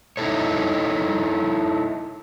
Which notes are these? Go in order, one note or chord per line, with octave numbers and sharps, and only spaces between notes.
D#4 E4 F#4 G4 A4 C#5